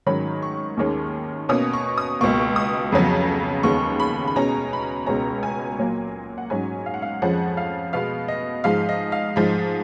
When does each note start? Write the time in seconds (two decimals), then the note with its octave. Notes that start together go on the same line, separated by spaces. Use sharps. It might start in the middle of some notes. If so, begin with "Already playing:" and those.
0.06 G#2 D#3 F#3 C#4 B5
0.43 C#6
0.77 D#2 D#3 G#3 C#4
1.49 B2 A#3 C#4 D#6
1.73 C#6
1.98 D#6
2.21 C#2 B2 A#3 C#6
2.56 D#6
2.92 F2 C#3 F#3 B3
3.63 D#2 C#3 G#3 B3 C#6
4.00 B5
4.27 B5
4.36 B2 G#3 C#4 A#5
4.73 B5
4.83 A#5
5.06 C#2 B2 G#3 C#4 A#5
5.43 G#5
5.79 A#2 F#3 A#3
6.38 F#5
6.50 G#2 F#3 C#4 G#5
6.86 F5
6.94 F#5
7.02 F5
7.22 F2 F3 G#3 C#4 F#5
7.57 F5
7.93 B2 G#3 B3 F5
8.28 D#5
8.64 G#2 F3 G#3 F5
8.89 D#5
9.12 F5
9.36 G#2 F3 G#3